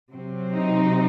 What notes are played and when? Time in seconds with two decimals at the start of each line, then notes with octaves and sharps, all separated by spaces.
0.11 C3 F#3 C4
0.55 D#4